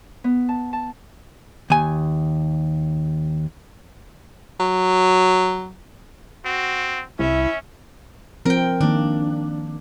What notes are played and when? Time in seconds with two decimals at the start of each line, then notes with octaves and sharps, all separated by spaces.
0.24 B3
0.49 A5
0.73 A5
1.70 D#2 G#5
4.60 F#3
6.45 C4 F#4
7.19 C2 C#4 E4 E5
8.45 F3 C4 A#4 G5
8.81 D#3 A#3 D4